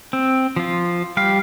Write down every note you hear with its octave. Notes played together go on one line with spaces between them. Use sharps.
C4
F3 F4
G3 G4 F5